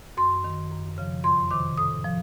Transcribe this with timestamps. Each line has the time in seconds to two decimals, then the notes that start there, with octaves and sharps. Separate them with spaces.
0.17 F#2 C6
0.44 D#3
0.71 F#2
0.98 C#3 F3
1.24 F2 C6
1.51 C3 D#3 D6
1.77 A2 D#6
2.05 F3